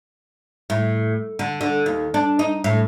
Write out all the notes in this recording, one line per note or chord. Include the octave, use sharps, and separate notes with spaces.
A2
D3
D3
D#2
D4
D#4
A2